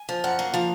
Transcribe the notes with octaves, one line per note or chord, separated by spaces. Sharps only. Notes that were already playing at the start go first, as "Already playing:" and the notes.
Already playing: G#5
F3
F#2 F#5
A#3
F3 F5